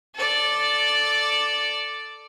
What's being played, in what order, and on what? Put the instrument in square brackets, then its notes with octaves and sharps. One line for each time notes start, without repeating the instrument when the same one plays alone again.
[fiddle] A4 D5